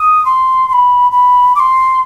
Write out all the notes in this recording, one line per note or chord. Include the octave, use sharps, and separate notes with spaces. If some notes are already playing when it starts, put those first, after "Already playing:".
Already playing: D#6
C6
C6
B5
B5
D6
C6